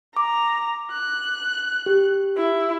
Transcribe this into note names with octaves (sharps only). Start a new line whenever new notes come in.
A#5 D6
F#6
G4
E4